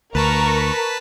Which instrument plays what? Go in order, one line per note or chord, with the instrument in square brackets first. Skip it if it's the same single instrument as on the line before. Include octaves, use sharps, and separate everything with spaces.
[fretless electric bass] D2 [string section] A#4 A#5 C#6 [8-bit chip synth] B4 A5 B6